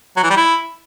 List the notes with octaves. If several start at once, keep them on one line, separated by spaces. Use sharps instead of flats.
F#3
E3
G3
E4